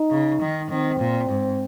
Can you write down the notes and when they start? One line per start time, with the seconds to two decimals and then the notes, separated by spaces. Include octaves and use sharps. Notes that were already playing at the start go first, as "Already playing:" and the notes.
Already playing: D#4
0.11 C#3
0.41 D#3
0.70 D#3 C4
1.00 A#2
1.30 G#2